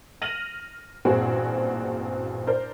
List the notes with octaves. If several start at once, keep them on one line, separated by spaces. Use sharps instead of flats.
F6 A#6 D#7 F7 F#7
A1 G2 A#2 C4 F#4 G#4
D4 A#4 C5